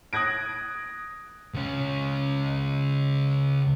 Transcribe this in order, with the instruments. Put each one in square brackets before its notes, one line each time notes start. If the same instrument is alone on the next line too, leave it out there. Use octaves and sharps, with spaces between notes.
[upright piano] D#6 F#6 G#6 A#6 D7
[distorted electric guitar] C#2 C#4